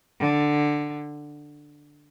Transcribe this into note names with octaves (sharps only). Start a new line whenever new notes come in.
D3